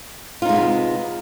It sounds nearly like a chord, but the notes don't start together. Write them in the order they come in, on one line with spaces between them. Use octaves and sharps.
F4 D#4 G#3 B3 C3